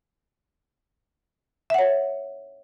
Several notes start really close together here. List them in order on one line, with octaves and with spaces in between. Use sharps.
E5 F#5 C#5